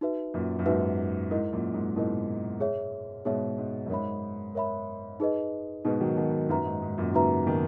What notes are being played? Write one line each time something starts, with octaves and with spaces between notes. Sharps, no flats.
D#4 F#4 B4 E5
F#2 A#2
F#2
G#2 D#4 F#4 B4 E5
G#2 E4 A#4 D#5
F#2 A#2
G#2
G#2 B2 E4 A#4 D#5
G#4 C#5 E5
G#2 B2 G#4 C#5 E5
G#2
F#2
G#2 A#4 C#5 E5 B5
A#4 C#5 E5 B5
D#4 G#4 B4 D#5
G#2 B2 D#4 G#4 B4 D#5
D#3 F#3
B2 D#3
F#2 A#2 D#4 F#4 B4 E5 A#5
G#2
G#2
F#2 A#2
A#2 C#3 D#4 F#4 B4 E5 A#5
B2 D#3